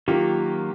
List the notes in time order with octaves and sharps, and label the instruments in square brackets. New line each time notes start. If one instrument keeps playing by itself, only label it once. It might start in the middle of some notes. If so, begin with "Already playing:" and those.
[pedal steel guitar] D#3 F#3 A#3 [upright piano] F4 G4